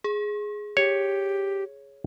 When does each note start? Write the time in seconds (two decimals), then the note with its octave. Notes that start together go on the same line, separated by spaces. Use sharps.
0.04 G#4
0.77 G4 C#5